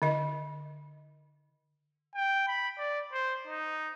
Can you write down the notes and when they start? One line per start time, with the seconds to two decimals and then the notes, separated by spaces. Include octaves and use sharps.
0.02 D3 D#5
2.15 G5
2.47 B5
2.78 D5
3.13 C5
3.47 D#4